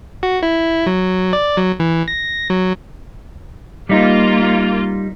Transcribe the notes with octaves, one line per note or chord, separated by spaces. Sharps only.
F#4
E4
F#3
D5
F#3
E3
A#6
F#3
G3 A#3 D#4 F4